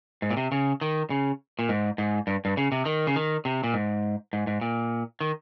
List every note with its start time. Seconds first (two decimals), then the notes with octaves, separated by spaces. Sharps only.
0.22 G#2
0.30 A#2
0.37 C3
0.52 C#3
0.81 D#3
1.10 C#3
1.59 A#2
1.69 G#2
1.98 G#2
2.27 G2
2.45 G2
2.57 C#3
2.72 C3
2.85 D#3
3.07 C#3
3.16 D#3
3.45 C3
3.64 A#2
3.74 G#2
4.33 G#2
4.47 G#2
4.61 A#2
5.21 D#3